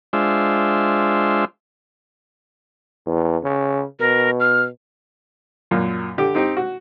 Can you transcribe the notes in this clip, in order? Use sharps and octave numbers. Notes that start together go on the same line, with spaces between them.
G#3 D4 F4 C5 E5
E2
C#3
B2 A#4
F6
F#2 A#2
D3 G4
C4 D#4 G4
F#4